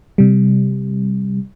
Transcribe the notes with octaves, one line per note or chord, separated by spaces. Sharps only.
C3 G3